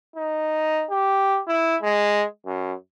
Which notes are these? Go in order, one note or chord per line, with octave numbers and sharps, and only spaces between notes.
D#4
G4
E4
G#3
F#2